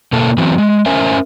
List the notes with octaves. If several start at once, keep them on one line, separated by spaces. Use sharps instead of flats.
B2 A#3 A4
E3 F#3 C4
G#3
C#4 A#4 C5 E5 G#5